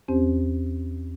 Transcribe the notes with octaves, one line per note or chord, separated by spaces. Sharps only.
E2 C4 C#4 G4 C5